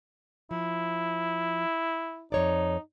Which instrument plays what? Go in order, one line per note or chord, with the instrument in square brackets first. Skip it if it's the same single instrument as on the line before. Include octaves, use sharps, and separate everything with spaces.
[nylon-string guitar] F3 [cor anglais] E4
[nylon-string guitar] F2 C#5 D5 [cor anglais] D#4